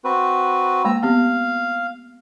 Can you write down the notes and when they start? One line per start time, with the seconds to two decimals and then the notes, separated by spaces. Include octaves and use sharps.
0.04 C4 F#4 B4
0.85 G#3 A#3 A#5 E6
1.03 B3 C4 G4 F5